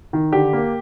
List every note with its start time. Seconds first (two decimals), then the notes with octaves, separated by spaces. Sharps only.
0.13 D#3
0.33 D3 G4
0.53 A#3